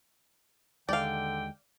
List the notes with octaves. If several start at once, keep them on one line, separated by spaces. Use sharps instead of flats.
D#2 D3 G#3 D5 F5 G5